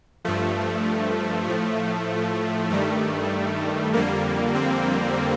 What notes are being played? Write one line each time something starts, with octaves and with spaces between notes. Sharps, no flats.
G2 F3 A3
A2 F3
G2 D#3 G3 A3
F2 D3 G3 A#3
C4